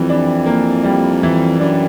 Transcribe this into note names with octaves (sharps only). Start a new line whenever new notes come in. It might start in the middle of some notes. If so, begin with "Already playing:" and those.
Already playing: F2 E3 G3
D4
A#3
G3
E3
F#2 D4